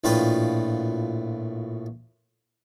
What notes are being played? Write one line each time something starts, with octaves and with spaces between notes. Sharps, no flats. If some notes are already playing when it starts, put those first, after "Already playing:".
A#1 A2 F4 B4 G5 B5